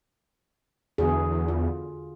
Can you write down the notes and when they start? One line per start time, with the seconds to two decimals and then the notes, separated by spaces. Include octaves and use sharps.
0.98 E2 D3 F#4 G#4
1.48 F4